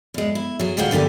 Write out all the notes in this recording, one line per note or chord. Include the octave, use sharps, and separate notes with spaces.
E2 G#3
E4
F#3 G#4
D2 A2 F4 F#4 G#4 G5
E2 D3 A#3 G4 G#5